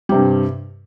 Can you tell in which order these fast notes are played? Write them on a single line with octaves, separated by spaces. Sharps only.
G3 C3 G2